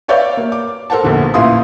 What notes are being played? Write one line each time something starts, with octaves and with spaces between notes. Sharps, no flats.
B4 C#5 D5 E5 F5 G6
A#3
D6
A4 A#4 C5 F#5 A5
A#1 E2 D3 F3
A1 A#2 E4 F4 C6 D#6